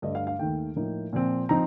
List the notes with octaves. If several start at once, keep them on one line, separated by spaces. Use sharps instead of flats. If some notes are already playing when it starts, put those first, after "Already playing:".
G2 D3 A3 D#5
F5
F5
D#2 D#3 A3 G5
A2 F3 A#3 D#4
A#2 F3 C4
F3 C4 D#4 A#5